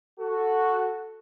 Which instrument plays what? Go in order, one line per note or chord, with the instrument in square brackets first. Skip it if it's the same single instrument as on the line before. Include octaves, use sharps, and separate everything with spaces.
[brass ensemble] F#4 A4